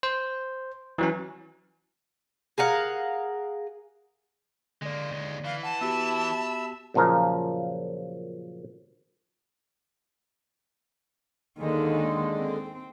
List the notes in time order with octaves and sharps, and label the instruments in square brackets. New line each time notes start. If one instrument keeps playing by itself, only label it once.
[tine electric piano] C5
E3 F#3 C#4
[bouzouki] G#4 A#4 F5 F#5
[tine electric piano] D3 D5 [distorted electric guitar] G#3 A#3
[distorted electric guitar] D#2 G#3
[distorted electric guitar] E3 [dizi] F5
[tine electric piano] F#5 [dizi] A5
[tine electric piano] B3 F#4 G4 [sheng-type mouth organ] E5 B5 E6
[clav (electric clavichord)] F#2 A#2 C#3 F3 A#4
[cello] D#2 D#3 [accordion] D3 G#3
[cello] C4